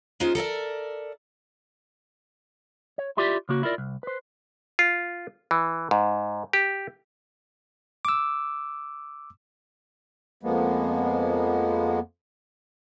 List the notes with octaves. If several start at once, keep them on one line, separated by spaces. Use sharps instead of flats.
G#3 C#4 D#4 F4 C5
A4 A#4 D5 E5
C#5
E4 F4 G4 D5 E5
C#3 A#3 F#4
E4 F4 A#4 D5
C2
B4 C5
F4
E3
G#2
G4
D6 E6
F2 F3 G#3 A#3 B3